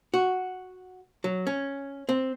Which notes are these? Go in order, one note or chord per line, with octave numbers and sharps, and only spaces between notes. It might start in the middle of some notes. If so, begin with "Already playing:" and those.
F#4
F#3
C#4
C4